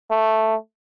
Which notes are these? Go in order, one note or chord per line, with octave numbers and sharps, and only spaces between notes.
A3